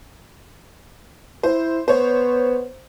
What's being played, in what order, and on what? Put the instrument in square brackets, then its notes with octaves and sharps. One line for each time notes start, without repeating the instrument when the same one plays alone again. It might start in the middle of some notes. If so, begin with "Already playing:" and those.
[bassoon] E4 [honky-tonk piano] C5
[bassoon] B3 [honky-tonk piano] C5 C#5